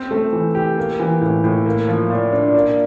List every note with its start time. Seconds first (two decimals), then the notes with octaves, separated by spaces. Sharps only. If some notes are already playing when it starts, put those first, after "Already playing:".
Already playing: C4
0.11 A3
0.33 E3
0.55 G4
0.78 A#3
0.99 E3
1.21 A2
1.44 A2
1.66 A#3
1.88 F3
2.10 A#2
2.32 D4
2.54 A#3